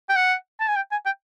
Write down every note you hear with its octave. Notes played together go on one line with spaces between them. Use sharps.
G5
F#5
A5
G#5
G5
G#5
G5